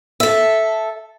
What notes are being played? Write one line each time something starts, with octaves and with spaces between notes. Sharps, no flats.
A4 E5